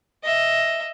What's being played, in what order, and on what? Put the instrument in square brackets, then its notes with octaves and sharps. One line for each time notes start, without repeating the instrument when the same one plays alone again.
[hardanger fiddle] D#5 E5